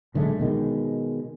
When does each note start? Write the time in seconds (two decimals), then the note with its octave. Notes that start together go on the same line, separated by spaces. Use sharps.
0.14 B1 D3 G#3 A3
0.39 B2 D#3 G#3